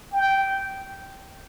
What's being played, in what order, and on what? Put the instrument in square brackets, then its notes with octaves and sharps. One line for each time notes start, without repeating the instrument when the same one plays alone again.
[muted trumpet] G5